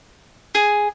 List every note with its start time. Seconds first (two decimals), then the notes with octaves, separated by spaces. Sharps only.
0.55 G#4